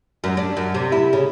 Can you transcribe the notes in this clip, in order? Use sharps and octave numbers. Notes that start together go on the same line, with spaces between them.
F#2
D4
F#2
C3
E4
C#3